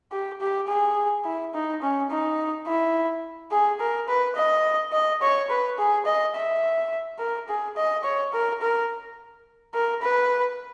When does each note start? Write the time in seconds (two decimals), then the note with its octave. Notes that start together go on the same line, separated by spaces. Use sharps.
0.12 G4
0.41 G4
0.68 G#4
1.25 E4
1.54 D#4
1.82 C#4
2.10 D#4
2.67 E4
3.51 G#4
3.80 A#4
4.08 B4
4.36 D#5
4.93 D#5
5.22 C#5
5.50 B4
5.78 G#4
6.06 D#5
6.35 E5
7.19 A#4
7.48 G#4
7.77 D#5
8.04 C#5
8.33 A#4
8.61 A#4
9.74 A#4
10.02 B4